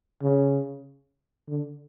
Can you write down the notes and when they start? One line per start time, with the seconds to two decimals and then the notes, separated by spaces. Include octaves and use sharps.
0.22 C#3
1.48 D3